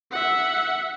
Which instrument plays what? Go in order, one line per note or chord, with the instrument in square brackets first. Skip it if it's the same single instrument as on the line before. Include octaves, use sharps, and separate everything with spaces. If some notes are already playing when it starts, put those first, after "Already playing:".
[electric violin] E5 F#5